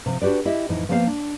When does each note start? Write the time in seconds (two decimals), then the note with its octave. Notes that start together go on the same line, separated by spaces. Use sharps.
0.06 C3 F3
0.22 D4 F#4 G4 B4 D5
0.45 E4 G4 D#5 E5
0.69 F2 A2 E3 D#4 E4
0.89 F3 A#3 B3 C5 D5 F5
1.07 D4